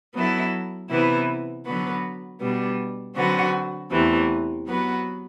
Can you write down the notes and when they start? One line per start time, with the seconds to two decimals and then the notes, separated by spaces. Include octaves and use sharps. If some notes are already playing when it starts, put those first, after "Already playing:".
0.14 F#3 B3 E4 A4
0.89 C3 E3 B3 E4
1.65 D3 F#3 B3 F#4 B4
2.40 B2 G3 B3 D4
3.15 D3 F#3 C4 F#4 B4
3.91 E2 C3 E3 A3
4.66 F#3 B3 F#4 B4